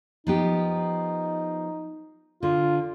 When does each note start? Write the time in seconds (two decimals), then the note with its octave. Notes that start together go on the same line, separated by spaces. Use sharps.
0.27 F3 B3 D#4 G4
2.43 D3 F4